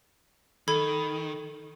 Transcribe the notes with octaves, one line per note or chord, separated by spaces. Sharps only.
D#3 A4 B5 G#6